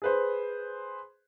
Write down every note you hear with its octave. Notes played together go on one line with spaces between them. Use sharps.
G#4 B4 C5